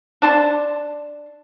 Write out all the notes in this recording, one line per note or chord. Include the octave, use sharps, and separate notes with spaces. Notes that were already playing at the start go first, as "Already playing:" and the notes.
D4 A5 C6